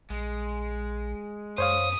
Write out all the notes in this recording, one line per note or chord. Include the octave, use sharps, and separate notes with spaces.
A#1 G#3
F#2 C5 C#5 F5 D#6